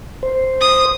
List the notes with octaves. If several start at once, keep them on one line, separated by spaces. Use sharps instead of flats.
C5
D#6